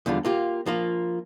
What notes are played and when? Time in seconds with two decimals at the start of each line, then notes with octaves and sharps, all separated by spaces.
0.06 E2 D3 G3 F4
0.25 A#3 F4 G4
0.66 F3 A#3 F4